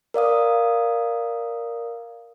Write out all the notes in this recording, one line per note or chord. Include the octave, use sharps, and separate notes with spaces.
A#4 D5 F5 D#6